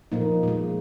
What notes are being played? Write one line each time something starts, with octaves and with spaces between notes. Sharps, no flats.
A#2 F3 A#3 D#4
A#2 G#3